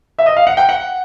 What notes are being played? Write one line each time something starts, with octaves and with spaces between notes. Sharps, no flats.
E5
D#5
F5
F#5
G5
F#5